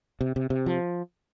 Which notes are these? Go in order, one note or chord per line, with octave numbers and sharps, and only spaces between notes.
C3
C3
C3
F3